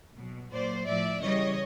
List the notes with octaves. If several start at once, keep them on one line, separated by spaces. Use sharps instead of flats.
B2 F#3
A#2 F#3 C5 D5
A2 F3 D5 E5
C#3 E3 G3 C#5 D#5